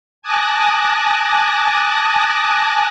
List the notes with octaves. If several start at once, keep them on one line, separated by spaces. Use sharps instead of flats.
G#5 A5 D6 D#6 F#6 A#6